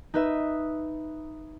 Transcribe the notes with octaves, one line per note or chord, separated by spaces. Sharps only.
D#4 B4 E5